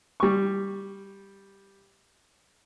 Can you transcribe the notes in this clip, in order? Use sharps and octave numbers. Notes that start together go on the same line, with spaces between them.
G3 C#6